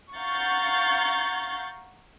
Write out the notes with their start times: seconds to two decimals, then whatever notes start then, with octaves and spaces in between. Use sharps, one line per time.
0.16 F5 F#5 A#5 C#6 G6 A6